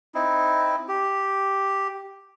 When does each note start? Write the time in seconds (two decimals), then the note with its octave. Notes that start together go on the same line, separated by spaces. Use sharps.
0.15 C4 D#4 E4
0.89 G4